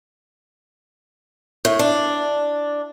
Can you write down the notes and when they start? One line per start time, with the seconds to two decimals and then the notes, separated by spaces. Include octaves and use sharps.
1.65 A2
1.79 D4